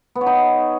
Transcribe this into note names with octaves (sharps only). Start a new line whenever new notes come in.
B3
C#5
D#4